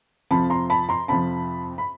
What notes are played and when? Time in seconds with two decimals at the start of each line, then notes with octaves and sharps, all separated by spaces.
0.31 F2 C3 F3 A5 B5
0.50 A#5 C6
0.70 A5 B5
0.89 A#5 C6
1.08 F2 C3 F3 A5 B5
1.78 B5